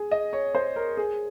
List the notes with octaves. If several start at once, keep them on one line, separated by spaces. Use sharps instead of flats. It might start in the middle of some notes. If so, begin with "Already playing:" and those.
Already playing: G#4
D#5
C#5
C5
A#4
G#4